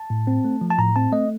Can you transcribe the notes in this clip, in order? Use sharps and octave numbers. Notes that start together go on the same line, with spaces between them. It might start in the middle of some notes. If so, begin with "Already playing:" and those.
Already playing: A5
A2
C4
A3
F3
A5
A2 A#5
C4 A5
A3 D#5